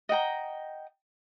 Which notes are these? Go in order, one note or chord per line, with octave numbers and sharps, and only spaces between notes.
D#5 F#5 G5 A#5